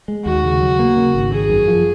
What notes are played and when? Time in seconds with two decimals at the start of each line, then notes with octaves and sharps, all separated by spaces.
0.08 G#3
0.25 D#2 F#4
0.43 C#3
0.61 F#3
0.79 A#3
0.97 C#3
1.15 G#1
1.32 D#3 G#4
1.50 F#2
1.68 F3